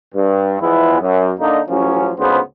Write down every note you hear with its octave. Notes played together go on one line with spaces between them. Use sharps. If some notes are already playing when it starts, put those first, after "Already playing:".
G2
E2 E3 F3 G#3 B3 E4
F#2
D3 A#3 D4 D#4
A1 F3 F#3 C#4
D2 G#2 C#3 F3 B3 C5